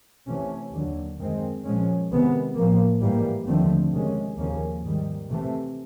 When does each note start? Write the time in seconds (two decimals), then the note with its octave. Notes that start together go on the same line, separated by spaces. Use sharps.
0.28 C3 E3 A3 C#4
0.73 D#2 D3 F#3
1.19 F#2 D#3 G#3 C4
1.65 A#2 F3 G#3 C#4
2.10 C3 D#3 G#3 B3
2.56 A2 F3 A#3
3.01 G#2 E3 G3 A#3
3.47 D#2 D3 F3 A3 C4
3.93 C3 D#3 G#3 C#4
4.38 D#2 C#3 F3 A#3 C#4
4.84 G#2 D#3 G3
5.29 C3 E3 A3